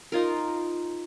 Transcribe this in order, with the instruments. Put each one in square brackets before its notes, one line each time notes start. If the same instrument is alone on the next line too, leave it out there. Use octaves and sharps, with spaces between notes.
[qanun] D#4 F4 A#4